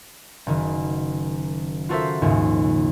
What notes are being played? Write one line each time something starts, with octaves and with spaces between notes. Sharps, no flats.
F#1 D#3
F4 F#4 A4 A#4 C5 E5
A#1 D#2 G#2 C#3